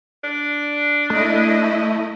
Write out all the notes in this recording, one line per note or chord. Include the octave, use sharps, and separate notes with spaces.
D4
A3 E4 D#5